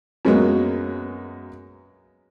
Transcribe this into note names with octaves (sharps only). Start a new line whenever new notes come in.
F#2 F#3 G#3 A#3 B3